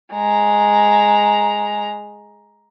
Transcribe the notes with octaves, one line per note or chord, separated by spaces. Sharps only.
G#3 A#5